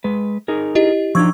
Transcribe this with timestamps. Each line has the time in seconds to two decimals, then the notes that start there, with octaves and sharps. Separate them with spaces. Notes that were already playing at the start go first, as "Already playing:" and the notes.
0.04 G#3 B4
0.48 D#4 G#4 A#4
0.75 E4 G4 D#5
1.15 F3 D4 D#4 C#6 E6 G#6